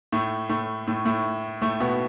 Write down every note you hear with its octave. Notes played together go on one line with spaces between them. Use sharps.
A2 A3
A2 A3
A2 A3
A2 A3
A2 A3
B2 B3